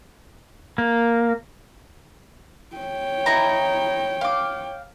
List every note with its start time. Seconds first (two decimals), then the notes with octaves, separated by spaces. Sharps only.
0.78 A#3
2.77 C#5 G5
3.26 D#4 E4 A#5
4.21 F5 D6